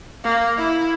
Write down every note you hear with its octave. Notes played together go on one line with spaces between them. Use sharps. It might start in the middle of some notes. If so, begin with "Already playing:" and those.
A#3
E4